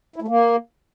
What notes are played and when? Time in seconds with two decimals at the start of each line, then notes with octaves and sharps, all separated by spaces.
0.16 E4
0.22 A3
0.28 A#3